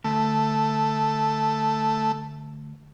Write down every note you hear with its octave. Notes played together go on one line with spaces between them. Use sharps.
D2 A3